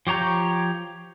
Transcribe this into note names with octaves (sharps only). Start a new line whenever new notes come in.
F3 G4 C#5 A#5 G6